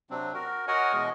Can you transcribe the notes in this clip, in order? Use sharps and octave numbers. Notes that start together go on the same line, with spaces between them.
C3 F#3 C4 D4
F#4 A#4
F#4 A#4 C#5 D#5 F#5 G#5
B2 E3 G#3 F#4 G#4 D#5